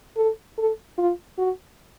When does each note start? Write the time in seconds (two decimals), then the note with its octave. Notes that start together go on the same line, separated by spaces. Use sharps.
0.17 A4
0.58 A4
0.99 F4
1.38 F#4